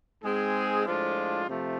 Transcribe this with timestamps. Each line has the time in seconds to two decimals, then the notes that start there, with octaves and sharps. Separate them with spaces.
0.23 G#2 G#3 C4 G#4
0.85 A2 F3 G#3 D4 F4
1.46 C3 F3 A3